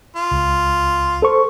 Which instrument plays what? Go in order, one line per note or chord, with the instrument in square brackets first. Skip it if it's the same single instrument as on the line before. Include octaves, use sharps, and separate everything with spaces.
[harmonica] F4
[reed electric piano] C#2
A4 C5 C#6